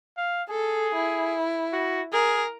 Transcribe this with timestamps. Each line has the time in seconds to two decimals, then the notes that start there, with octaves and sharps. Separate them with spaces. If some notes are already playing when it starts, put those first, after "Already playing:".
0.17 F5
0.50 G#4 A4
0.95 E4
1.73 F#4
2.13 G#4 A#4